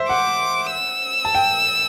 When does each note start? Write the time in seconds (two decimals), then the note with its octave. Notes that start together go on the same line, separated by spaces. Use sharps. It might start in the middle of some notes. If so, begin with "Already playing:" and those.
Already playing: C5 E5
0.09 F#5 D6
0.71 E6
1.25 A5
1.35 G5